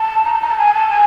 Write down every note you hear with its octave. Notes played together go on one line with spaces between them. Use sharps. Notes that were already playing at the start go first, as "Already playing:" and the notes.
Already playing: A5
A#5
A5
A#5
A5
G#5
A5
G#5